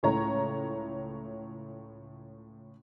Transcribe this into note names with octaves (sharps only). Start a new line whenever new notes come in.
C#2 A2 C#5 A#5